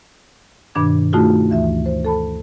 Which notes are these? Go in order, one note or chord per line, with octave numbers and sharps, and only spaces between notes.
G2 B2 D#3 D4 D6 G#6
A3 D#4 F4 F#4 G#4
D2 E3 E5
C5
A4 A5 B5